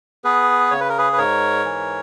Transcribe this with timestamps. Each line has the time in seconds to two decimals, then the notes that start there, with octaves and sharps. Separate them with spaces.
0.24 B3 G#4 B4
0.71 C#3 C#5
0.80 B4
0.89 A#4
0.98 G#4 B4
1.13 B4
1.18 G#2 A#4 C#5
1.65 E3